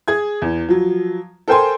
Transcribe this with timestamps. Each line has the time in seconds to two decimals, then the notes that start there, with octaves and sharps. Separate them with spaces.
0.08 G#4 G#6
0.42 E2
0.69 F3 F#3
1.48 A4 A#4 C5 G5 G#5 C6